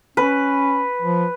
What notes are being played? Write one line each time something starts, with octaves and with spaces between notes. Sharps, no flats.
C#4 B4
F3